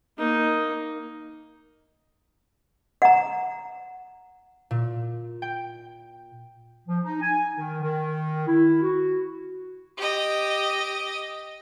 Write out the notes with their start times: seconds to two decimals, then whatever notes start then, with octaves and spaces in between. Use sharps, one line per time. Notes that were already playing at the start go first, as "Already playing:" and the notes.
0.18 A#3 D#4
3.02 F#5 A#5
4.71 A#2
5.42 G5
6.88 F3
7.04 D#4
7.21 G#5
7.56 D#3
7.81 D#3
8.47 E4
8.81 F#4
9.98 G4 D#5